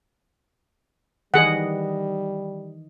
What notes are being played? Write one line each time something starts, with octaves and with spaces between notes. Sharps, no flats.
D#3 E3 G3 G#4 D#5 F#5